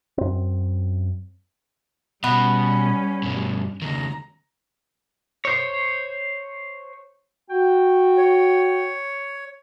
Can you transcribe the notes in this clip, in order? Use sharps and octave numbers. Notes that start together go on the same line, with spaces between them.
F#2 C4
B2 G3 B3 C#4
G2 B2
C#2 D#3 A#5
C5 C#5
F#4 G5
C#5